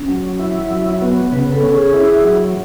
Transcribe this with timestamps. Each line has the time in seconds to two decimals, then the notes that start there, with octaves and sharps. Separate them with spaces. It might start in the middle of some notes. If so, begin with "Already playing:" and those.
Already playing: C#4
0.08 F#3
0.39 E4
0.71 F#3
1.02 B3
1.32 C#3 B4
1.52 A4
1.63 C#4
1.73 G#4
1.93 E4 G#4
2.25 F#3